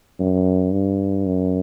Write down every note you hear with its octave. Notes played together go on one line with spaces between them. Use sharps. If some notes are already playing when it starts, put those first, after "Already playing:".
F#2
G2
F#2